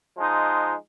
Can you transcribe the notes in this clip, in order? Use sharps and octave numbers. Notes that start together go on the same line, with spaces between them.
F3 G#3 D#4